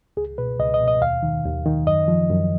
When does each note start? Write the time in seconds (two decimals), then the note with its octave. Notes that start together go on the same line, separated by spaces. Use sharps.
0.17 C#2 G#4
0.38 B2 B4
0.59 C#2 D#5
0.74 D#5
0.80 B2
0.88 D#5
1.01 D#2 F5
1.23 D#3
1.45 D#2
1.66 D#3
1.87 F#2 D#5
2.08 F3
2.30 F#2